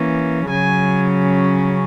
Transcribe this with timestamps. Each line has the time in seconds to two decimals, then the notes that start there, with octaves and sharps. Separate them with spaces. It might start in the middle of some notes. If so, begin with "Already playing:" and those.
Already playing: E3 A#3 C#4
0.50 C#3 F#3 C#4 G#5